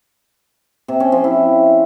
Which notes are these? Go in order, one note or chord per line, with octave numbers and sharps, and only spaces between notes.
C3
C#4
F3
E4